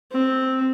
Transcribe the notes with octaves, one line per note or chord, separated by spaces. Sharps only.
C4